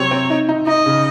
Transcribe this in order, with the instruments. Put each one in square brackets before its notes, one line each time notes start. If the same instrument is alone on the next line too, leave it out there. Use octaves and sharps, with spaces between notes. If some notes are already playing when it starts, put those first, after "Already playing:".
Already playing: [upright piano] C3 F#3 C4 [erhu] C#5
[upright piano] C4
D#4
D#4
[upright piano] D#4 [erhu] D#5
[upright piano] C#3